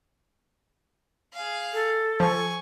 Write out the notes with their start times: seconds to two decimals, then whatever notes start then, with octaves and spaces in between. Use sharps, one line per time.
1.34 G#4 F5
1.73 A4
2.20 F3 G#5 C#6